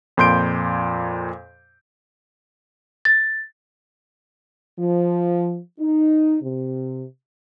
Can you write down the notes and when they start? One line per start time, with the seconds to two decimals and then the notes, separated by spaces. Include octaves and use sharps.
0.17 F2 A#2 C6 G6 D7
3.05 A6
4.78 F3
5.78 D#4
6.42 C3